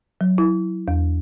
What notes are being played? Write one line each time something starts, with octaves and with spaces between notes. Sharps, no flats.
F#3
E4
E2